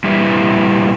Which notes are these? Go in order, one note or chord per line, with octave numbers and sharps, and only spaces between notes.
A#2 G3 E4 G4 B4 E5